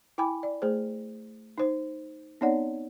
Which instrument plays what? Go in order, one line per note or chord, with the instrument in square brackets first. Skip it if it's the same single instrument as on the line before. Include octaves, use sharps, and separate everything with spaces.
[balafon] E4 G5 G#5 B5 D6
D5
A3 G#4 C5
D#4 C5
B3 C4 D#4 C#5 D5 F#5